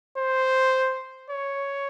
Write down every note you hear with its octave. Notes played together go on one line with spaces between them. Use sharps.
C5
C#5